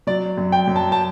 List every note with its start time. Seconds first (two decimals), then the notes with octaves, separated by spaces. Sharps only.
0.07 F#3 D5
0.37 F#2
0.52 G5
0.68 F#2
0.76 A5
0.92 A5